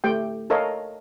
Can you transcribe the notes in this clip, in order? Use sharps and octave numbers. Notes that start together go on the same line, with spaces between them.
A3 G4 G5
A4 A#4 C#5 D#5 F5